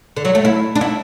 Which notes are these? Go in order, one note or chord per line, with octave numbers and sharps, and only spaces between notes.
D3
F#3
A3
E4
D4
E4